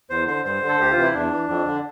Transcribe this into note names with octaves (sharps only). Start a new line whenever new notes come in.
E2 C5
D3 C5
G2 C5
D3
A4
D2 G4
F4
C3 E3
E4
E2 D4
E3
F2
D3